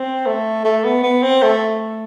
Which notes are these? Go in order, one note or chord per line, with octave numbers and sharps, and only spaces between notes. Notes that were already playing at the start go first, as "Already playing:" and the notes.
Already playing: C4
A3
A3
B3
B3
C4
A3